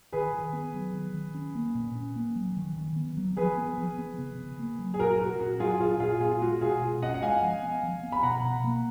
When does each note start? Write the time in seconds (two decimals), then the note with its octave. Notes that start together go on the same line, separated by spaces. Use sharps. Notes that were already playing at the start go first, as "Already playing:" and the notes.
0.13 D#3 G#4 B4
0.33 D#3
0.53 B3
0.74 F#3
0.93 D#3
1.14 D#3
1.34 C#4
1.55 A#3
1.75 A#2
1.95 C#4
2.16 A#3
2.36 F#3
2.57 D#3
2.76 D#3
2.96 B3
3.17 F#3
3.37 F3 G#4 B4
3.57 B3
3.78 F3
3.98 B3
4.18 C#3
4.39 C#3
4.59 A#3
4.79 F#3
4.94 G#4
4.99 A#2 F#4 A#4
5.19 A#2 F#4
5.39 C#4 F#4
5.60 F#3 F4 G#4
5.80 A#2 F4 G#4
6.00 A#2 F4 G#4
6.20 B3 F4 G#4
6.41 G#3 F#4
6.61 B2 F4 G#4
6.82 B2
7.02 C#4 D#5 F#5
7.14 F#5
7.22 G#3 F5 G#5
7.42 F3
7.63 B3
7.83 F3
8.03 B3
8.12 B5
8.23 B2 F#5 A#5
8.44 B2
8.64 A#3